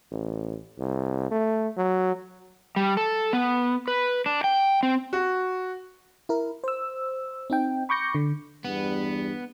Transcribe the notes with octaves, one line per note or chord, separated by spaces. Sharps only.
A1
C2
A3
F#3
G3
A4
B3
B4
D4
G5
C4
F#4
E4 A#4
C5 E6
C4 D#4 G5
B5 C#6 D6 G6 A#6 C#7
D3
E2 G2 G3 B3